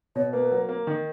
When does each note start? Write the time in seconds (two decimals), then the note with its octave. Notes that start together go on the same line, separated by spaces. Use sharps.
0.15 B2 C#5
0.33 A#3 B4
0.51 F#3
0.69 A#3
0.87 D#3